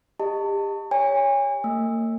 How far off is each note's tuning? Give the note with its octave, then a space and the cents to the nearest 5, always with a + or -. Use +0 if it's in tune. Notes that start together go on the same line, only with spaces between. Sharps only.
G4 +30 D#5 +0 A5 +30
C#5 +10 G#5 -35
A#3 -45 E6 +0